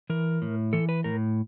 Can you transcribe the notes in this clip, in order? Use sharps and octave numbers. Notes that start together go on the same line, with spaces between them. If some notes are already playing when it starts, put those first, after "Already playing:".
E3 A#4
A2
E3 A4
B4
A2 A#4